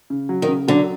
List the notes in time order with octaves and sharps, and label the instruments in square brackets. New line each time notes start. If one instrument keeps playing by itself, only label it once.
[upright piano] C#3
F#3
[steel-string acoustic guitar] D#3
[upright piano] C#3
[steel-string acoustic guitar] D3 [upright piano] F#3